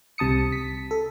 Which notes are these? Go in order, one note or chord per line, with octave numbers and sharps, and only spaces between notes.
C2 C3 A5 D#6 C#7
B6
A4